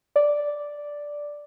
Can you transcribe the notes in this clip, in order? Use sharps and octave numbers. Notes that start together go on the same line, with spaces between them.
D5